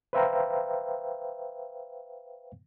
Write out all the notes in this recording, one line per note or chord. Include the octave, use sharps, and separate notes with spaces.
B4 C5 E5 F5 G5 A#5